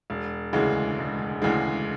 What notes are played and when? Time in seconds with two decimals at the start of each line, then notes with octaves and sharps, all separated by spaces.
0.10 E1
0.53 D2 C#3 E3 G#3
0.98 E1
1.42 D2 C#3 E3 G#3